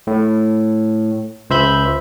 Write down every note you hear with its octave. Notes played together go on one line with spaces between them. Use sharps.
A2
C#2 C5 E5 B5 G6